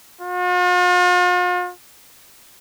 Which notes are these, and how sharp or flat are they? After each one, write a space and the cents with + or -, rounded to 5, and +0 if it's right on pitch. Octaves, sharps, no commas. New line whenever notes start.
F4 +45